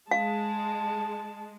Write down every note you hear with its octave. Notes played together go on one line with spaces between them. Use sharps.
G#3 F5 A5